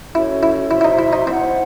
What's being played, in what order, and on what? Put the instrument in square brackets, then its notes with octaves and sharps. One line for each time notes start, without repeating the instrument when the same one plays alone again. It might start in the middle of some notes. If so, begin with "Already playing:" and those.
[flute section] C#4 F#4 A4 C#5 [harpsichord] E4
[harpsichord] E4
[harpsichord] E4 [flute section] F#4 C5 E5 C6
[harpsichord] E4
D#4
E4
D#4
[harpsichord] C4 [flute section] E4 C5 F#5